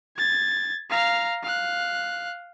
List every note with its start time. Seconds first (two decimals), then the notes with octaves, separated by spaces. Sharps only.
0.17 G#6 A6
0.90 F5 A#5
1.43 F5 F#6